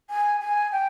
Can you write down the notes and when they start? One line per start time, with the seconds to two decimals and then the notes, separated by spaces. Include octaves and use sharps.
0.10 G#5
0.41 G#5
0.72 G5